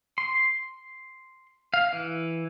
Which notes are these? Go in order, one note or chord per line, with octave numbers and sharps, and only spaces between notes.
C6
F5
E3